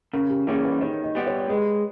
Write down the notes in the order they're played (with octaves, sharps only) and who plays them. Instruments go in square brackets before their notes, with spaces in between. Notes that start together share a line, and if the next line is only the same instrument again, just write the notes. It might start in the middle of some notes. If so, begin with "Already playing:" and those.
[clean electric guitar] C#3 [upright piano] A#4
[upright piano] G4
[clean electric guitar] E3 G3 A#3 C#4 [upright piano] G#4
[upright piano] B4
[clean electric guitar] D#3 [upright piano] C#5
[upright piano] D#5
[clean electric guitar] G3 B3 G4
[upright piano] C#5
[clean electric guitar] G#3 [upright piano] B4